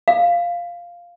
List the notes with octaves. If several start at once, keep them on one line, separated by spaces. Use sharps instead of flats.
F5